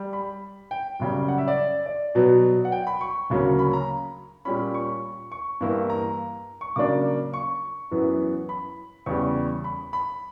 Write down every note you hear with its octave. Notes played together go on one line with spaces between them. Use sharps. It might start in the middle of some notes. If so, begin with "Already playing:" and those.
Already playing: G3
B5
G5
F#2 C#3 G3
F#5
E5
D5
D5
B2 F#3 B3
F#5
G5
B5
C#6
D2 C#3 F#3 A#3 C#4
B5
A#5
A#2 G3 C#4 B5
C#6
C#6
G2 E3 A#3 E4
A#5
C#6
C#3 F#3 A#3 D4 D6
C#6
F#2 E3 B3
B5
E2 C#3 G3 C#6
B5
B5